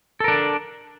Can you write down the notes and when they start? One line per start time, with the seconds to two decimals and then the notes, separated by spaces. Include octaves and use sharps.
0.20 A4
0.24 A#4
0.28 D4